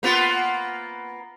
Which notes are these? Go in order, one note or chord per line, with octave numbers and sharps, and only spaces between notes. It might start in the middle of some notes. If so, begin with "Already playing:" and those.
A#3 B3 F4